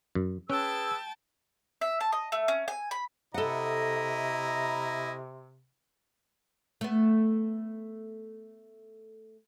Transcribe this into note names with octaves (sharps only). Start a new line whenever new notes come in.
F#2
C#4 G#4 B4 G5 A5 E6
E5
A5
D#5
A3
C#4
G#5
B5
C3 E4 A4 D#5 F#5 A#5
A3 B3